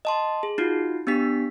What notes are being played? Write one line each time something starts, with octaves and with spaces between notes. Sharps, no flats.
D#5 A5 C6
G#4
D#4 F4 F#4
B3 D4 G4 B6